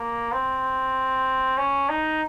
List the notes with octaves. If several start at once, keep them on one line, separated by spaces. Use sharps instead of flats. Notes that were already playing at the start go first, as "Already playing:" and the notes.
Already playing: A#3
C4
C#4
D#4